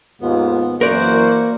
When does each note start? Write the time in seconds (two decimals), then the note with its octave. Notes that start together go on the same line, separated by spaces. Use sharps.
0.21 D#2 G#2 B3 F4
0.81 F#2 E3 A#3 F#4 A#4 C5 D5 F#5